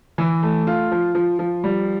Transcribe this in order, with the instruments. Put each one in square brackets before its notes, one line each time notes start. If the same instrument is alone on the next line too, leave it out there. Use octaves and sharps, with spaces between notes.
[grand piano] E3
A3
F4
F3
F3
F3
G3